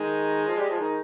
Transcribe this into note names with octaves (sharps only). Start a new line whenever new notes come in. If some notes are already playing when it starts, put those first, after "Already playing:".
Already playing: D#3 G#3 D#4
F3 F4
G3 G4
F3 F4
D#3 D#4